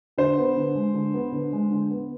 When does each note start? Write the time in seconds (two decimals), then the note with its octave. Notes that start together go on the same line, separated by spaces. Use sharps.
0.18 D3 C5
0.38 B3
0.56 D3
0.75 G#3
0.94 D3
1.14 B3
1.32 D3
1.52 G#3
1.71 D3
1.91 B3